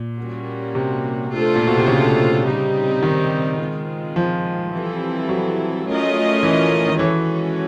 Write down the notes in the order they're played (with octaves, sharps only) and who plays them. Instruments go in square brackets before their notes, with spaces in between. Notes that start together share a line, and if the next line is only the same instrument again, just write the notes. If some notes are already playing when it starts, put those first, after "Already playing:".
Already playing: [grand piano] A#2
[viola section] G3 A#3 C#4 F#4
[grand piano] C3
[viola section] A3 D4 F4 A4 C5
[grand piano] A#2
B2
C3
C#3
[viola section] G3 C4 D#4 G4
[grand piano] D#3
[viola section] G#3 C4 F4
[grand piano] F3
[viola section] E3 G3 C4 E4 A4
[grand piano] F#3
[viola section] A3 C#4 F4 A#4 D#5
[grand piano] E3
D#3
[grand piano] E3 [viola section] G#3 C#4 F#4 A4 C#5